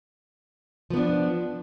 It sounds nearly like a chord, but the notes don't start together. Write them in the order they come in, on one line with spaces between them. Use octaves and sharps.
F3 B3 D4